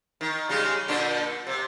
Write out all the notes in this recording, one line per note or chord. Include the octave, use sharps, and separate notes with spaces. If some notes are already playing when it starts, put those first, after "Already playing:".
D#3
C#3 G3 G#3
A#2 D3 D4
C3